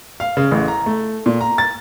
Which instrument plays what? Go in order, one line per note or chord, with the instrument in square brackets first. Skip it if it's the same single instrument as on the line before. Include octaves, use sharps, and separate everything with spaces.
[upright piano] F5
C#3
A1
A#5
A3
A#2
A#5
A6